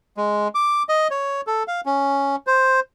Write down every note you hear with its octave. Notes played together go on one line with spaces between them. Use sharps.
G#3
D6
D#5
C#5
A4
F5
C#4
C5